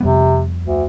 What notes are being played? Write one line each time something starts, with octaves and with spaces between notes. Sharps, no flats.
F2 C3 G3 B3
D2